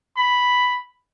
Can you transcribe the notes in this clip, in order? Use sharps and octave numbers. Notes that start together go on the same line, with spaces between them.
B5